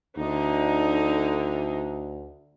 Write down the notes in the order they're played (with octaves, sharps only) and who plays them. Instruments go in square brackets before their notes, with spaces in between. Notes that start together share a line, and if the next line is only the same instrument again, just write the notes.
[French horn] D2 [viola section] D3 D#4